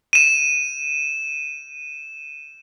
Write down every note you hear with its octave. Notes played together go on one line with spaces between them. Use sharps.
D#7 E7